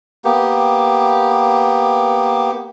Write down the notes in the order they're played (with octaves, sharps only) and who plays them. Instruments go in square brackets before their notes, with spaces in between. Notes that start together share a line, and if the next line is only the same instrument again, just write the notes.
[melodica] A#3 B3 G4